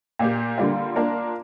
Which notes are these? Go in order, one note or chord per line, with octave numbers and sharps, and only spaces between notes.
A#2 A#3 G4
D3 G3 A#3 F4
A#3 D4 F4 A#4